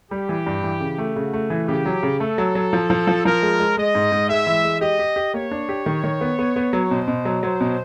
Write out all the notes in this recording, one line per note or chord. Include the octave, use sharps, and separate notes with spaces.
G3 G4
E3
G2
E3
C#3
A3
C#3 F#4
A3
E3
C#3 G4
F#3
C#3
A3 A4
F#3
F#3
F3
F3
F3
F3 A#4
G#3
G#3
G#3 D#5
G#2
G#2
G#3 E5
E3
G#3
G4 D#5
G4
G4
A#3 C#5
D4
G4
D#3
D#3
B3
B3
B3
F#3
B2 C5
B2
F#3
F#3 C5
B2